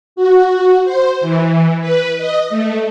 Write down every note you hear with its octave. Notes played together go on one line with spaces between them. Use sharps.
F#4
C5
E3
B4
D#5
A3